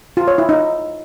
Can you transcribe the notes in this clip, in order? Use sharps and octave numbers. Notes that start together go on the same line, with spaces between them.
F4
C#5
E4
D#4